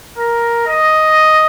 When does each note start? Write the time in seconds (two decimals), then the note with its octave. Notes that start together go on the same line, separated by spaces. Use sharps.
0.18 A#4
0.67 D#5